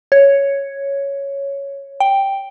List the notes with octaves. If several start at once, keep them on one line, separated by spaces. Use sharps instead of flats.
C#5
G5